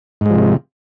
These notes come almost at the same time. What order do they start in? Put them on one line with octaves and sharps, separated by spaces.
G#2 G#3 F3 C3